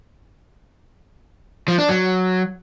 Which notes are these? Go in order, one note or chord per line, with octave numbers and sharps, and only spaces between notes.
F3
D4
F#3